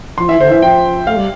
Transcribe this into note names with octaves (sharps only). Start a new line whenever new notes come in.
F3 C6
E3 E5
D3 C5
E3 E5
F3 G5
A3 F5
G3